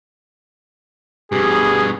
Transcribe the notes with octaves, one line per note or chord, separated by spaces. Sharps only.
G2 B2 G4 G#4